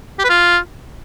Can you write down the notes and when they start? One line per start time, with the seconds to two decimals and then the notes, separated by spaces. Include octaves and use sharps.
0.19 G4
0.24 B4
0.29 F4